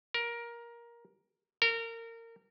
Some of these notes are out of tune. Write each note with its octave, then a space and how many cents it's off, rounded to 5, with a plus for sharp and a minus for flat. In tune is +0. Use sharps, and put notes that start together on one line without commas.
A#4 +15
A#4 -25